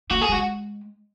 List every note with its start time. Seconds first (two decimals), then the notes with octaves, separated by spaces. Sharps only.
0.11 A#3 F#4
0.22 G#4
0.29 G#3 F#4